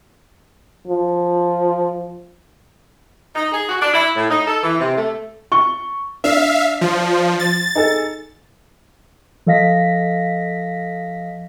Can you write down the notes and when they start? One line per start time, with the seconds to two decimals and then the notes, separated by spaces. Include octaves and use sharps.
0.87 F3
3.35 D#4
3.52 G#4
3.69 F#4
3.81 D4
3.94 E4
4.16 A2
4.29 D#4
4.47 A4
4.63 E3
4.80 C3
4.96 A3
5.52 C#6 G7
6.24 D4 E5 F5
6.81 F3
7.39 A6
7.75 D#4 G#4 A4
9.46 F3 A4 D#5 F5 A#6 B6